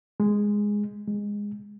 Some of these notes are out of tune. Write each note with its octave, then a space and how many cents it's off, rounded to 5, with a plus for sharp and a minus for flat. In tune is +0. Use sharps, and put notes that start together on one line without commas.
G#3 -5
G#3 -15